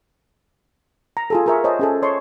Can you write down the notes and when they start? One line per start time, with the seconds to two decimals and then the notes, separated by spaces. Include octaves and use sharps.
1.17 A#5
1.30 F4 G#4 A4
1.46 G#4 A#4 E5 C#6
1.64 C5 C#5 D#5 G#5 A5
1.79 C#4 G#4 A4
2.03 C#5 D#5 A5 C6 C#6